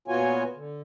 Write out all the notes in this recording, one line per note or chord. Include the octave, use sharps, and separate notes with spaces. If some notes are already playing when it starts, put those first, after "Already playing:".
A#2 B3 F4 F#4 C#5 G#5
D3